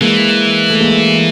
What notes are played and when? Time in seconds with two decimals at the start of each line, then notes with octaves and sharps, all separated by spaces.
0.01 E3 G#3 A#3
0.69 A3
0.80 G#3 A#3